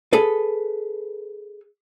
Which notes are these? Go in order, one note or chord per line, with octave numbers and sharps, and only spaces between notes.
G#4 A4 B4